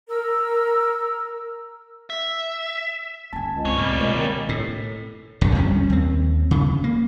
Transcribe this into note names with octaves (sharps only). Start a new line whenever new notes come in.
A#4 E6
E5
D3 C#4 G#5 A5
C#2
C2 G2 C4 D4 C#5
A2 G3 A#3
B2 G#3 A#4 C#5
D#3
A2
F1 B1 F2 D3
F2 G3 B3 C#4
D#2 C4
C#3
A#3